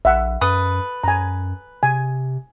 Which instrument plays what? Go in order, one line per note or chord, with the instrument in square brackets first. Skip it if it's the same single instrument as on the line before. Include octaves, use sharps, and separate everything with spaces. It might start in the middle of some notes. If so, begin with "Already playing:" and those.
[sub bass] A#1 [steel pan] E5 F#5
[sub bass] F#2 [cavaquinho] A4 B4 D#6
[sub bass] F#2 [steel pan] G#5 A#5
[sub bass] C3 [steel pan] G#5